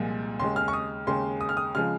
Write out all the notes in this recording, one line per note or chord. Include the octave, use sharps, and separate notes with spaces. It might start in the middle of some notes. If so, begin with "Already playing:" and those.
Already playing: C2 A#2 F3 G#3
D#2 C#3 G#3 C6
F6
C#6
D#6
D#2 C#3 G#3 C6
D#6
F6
D#6
C#3 F3 G#3 F6